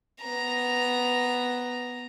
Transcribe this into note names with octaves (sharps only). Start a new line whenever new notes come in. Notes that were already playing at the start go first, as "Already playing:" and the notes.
B3 A#5